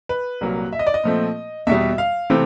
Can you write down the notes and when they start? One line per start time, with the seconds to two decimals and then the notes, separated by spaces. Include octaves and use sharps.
0.09 B4
0.41 C2 A#2 F#3 A#3
0.73 E5
0.79 D#5
0.87 D5
0.94 D#5
1.03 A#2 F3 A3 C4
1.67 E2 B2 G3 E5
1.98 F5
2.30 C3 E3 A3 C4